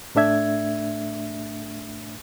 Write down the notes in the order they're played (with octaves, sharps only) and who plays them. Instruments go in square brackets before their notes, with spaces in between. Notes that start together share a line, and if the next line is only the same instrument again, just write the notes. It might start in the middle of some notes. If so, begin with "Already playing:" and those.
[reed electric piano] A2 A3 D4 E5 G#6